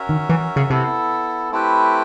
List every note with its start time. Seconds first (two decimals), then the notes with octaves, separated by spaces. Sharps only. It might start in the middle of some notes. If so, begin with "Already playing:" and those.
Already playing: C#4 F#4 A#4 C#5 E5
0.09 D#3
0.29 E3
0.56 C#3
0.70 C3 B3 E4 A4
1.52 A3 C4 E4 G4 B4